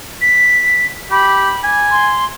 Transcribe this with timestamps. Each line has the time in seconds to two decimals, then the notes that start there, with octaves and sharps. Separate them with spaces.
0.21 B6
1.11 G4 B5
1.64 G#5
1.91 C6